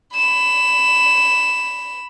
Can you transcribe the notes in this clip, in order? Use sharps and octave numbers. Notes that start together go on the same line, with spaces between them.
B5 E7